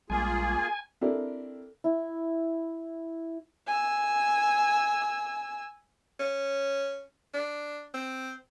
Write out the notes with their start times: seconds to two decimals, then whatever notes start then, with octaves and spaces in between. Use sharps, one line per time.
0.10 A#1 G3 G#3 A#3 F4 G#4 G#5
1.01 C4 D4 E4 G4 A4 A#4
1.84 E4
3.67 G#5 E6
6.20 C#4
7.34 D4
7.94 C4